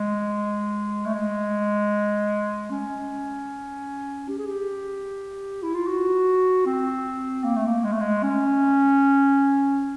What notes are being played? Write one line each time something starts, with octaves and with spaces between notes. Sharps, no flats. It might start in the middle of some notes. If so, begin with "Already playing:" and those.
Already playing: G#3
A3
G#3
C#4
G4
G#4
G4
E4
F4
F#4
C4
A#3
A3
A#3
G#3
A3
G#3
C#4